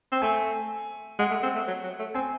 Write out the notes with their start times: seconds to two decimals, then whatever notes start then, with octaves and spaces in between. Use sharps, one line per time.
0.12 C4
0.22 A3 G#5
1.19 G#3 F#5
1.31 A3
1.43 C4
1.55 A3
1.67 F#3
1.83 F#3
1.99 A3
2.14 C4 G#5